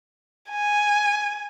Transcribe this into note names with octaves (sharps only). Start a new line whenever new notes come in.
G#5